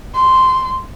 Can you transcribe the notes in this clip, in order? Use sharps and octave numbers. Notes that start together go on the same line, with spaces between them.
C6